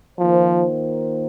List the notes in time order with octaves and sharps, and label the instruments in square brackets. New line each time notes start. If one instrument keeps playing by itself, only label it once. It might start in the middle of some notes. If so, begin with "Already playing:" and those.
[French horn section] D#3 A#3 F4 C5 [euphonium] F3